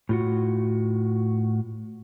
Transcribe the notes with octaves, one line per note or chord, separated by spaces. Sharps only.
A2 F4 F#4